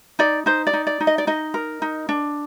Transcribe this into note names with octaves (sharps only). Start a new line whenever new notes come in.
D#4 D5
D#4 C5
D5
D#4
D5
D#4
D#5
D5
D#4 D#5
A#4
D#4
D4